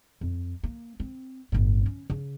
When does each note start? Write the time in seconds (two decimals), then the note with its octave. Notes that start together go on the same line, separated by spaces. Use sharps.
0.21 F2
0.63 A#3
1.00 C4
1.52 G1 A2
1.86 C#4
2.10 C#3